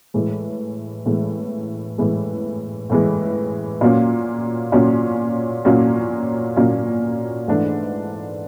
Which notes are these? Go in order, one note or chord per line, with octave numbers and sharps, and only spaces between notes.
A2 E3 G#3
A2 E3 G#3
A2 E3 G#3
A2 E3 G#3
A#2 F#3 A#3 C#4
A#2 F#3 A#3 C#4
A#2 F#3 A#3 C#4
A#2 F#3 A#3 C#4
G#2 E3 A3 D4